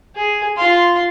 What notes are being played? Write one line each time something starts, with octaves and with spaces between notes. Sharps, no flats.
G#4
F4 C6